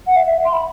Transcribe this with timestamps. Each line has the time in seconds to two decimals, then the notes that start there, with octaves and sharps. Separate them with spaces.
0.07 F#5
0.16 E5
0.27 E5
0.45 C6
0.53 B5